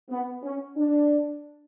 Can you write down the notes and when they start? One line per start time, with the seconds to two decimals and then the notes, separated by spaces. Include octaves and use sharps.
0.10 B3
0.43 C#4
0.77 D4